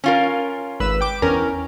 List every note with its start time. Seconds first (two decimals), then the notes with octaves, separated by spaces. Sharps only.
0.04 C#4 F4 A#4
0.80 G#1 B4 E6
1.01 G5 D6
1.22 E2 C#4 A#4